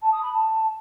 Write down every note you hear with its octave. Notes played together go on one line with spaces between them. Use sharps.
A5
D#6
B5
A5